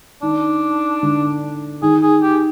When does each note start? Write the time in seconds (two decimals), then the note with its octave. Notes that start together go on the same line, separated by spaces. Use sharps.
0.22 D#3 D4
1.03 D3
1.82 D#3 G#4
2.02 G#4
2.22 G4